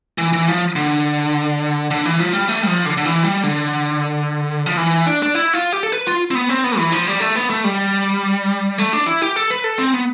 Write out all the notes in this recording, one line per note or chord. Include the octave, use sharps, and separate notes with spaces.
E3
E3
F3
D3
D3
E3
F3
G3
A3
G3
F3
D3
D3
E3
G3
D3
F3
E3
D4
D4
E4
F4
G4
A4
B4
F4
C4
B3
C4
B3
E3
F3
G3
A3
B3
A3
G3
A3
D4
E4
G4
A4
B4
A4
C4
B3